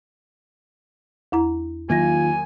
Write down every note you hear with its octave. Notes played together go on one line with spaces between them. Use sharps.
E2 E4 A#5
D#3 F#3 A#3 F4 G#5 A#6